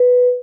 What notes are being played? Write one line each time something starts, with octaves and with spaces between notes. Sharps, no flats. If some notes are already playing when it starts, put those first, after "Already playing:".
Already playing: B4